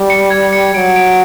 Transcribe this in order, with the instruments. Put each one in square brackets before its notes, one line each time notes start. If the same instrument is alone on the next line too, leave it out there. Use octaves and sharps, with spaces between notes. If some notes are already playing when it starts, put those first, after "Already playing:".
Already playing: [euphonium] G3
[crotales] C#7
G#6
C#7
[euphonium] F#3 [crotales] D7
[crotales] D7